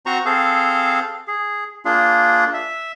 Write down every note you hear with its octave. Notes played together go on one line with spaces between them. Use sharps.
C4 F#4 C5 A#5 C#6
C4 G#4 A4 C5 F5
G#4
A#3 D4 F4 G#4
E5